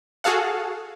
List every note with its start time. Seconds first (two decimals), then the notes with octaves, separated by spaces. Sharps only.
0.24 F#4 G#4 A4 F5 F#5